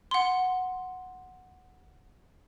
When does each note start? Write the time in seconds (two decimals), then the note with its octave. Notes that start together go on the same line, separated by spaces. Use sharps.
0.11 F#5 C6